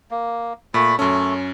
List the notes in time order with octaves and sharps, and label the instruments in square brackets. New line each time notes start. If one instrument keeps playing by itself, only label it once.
[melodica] A#3
[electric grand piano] A#2 [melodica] A3 B5
[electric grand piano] F#2 C#4 [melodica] A3 A4